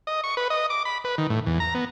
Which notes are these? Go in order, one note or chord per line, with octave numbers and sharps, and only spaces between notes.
D#5
C#6
B4
D#5
D6
B5
B4
D#3
A2
E2
A#5
B3